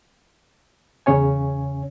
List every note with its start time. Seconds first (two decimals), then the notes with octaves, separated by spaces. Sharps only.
1.06 E2 C#3 C#4 C#5 G#5